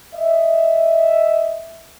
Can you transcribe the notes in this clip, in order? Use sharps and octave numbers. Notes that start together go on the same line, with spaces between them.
D#5 E5